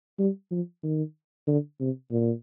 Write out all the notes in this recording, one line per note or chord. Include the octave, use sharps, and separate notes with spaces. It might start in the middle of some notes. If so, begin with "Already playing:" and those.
G3
F3
D#3
D3
C3
A#2